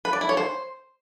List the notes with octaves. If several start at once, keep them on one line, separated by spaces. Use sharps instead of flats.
B4
D5
E4
C#5
C5